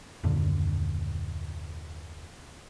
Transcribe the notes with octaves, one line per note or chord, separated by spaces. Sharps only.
D#1 F#2 A#2 D3